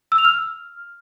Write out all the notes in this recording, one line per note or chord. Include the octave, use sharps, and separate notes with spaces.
E6
F7
F6